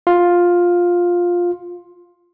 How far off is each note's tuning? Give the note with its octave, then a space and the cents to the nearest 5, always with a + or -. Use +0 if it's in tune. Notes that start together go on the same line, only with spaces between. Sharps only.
F4 +10